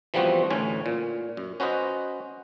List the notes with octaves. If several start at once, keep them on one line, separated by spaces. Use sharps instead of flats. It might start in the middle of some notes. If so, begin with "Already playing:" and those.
E3 F3 G3 B3 C4 F#4
D2 A2 E3 C#4 G#5
A#2
F#2
C#4 F#4 B4 C5 D#5